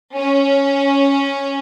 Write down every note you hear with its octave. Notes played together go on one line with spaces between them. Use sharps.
C#4